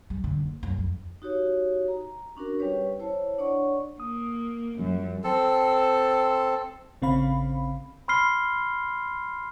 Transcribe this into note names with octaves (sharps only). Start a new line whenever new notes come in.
G3
D3
F#1
F#2
F2
D#4 F#4 G4 C#5
A#5
C#4 D4 F#4 A#4
G3 C#4 G4 B4 C#5
E4 C5 C#5 A5
D4 C#5 D5 F#5 C#6
A#3 D#6
F#2 F3 G3
C4 A4
A1 C#3 C4 C#4 F5 B5
B5 C6 F6 C7 G7